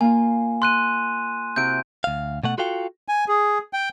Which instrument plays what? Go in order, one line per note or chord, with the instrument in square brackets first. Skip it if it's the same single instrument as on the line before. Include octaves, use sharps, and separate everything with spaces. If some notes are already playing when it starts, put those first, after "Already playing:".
[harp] A#3 F4 [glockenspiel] G#5
[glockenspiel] C6 F#6 D#7
[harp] C3 E4 F#4 [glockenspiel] G6 D7
[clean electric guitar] D2 F5
B2 A3 F#5
F4 F#4 A4 F5 G5
[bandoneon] G#5
G#4
G5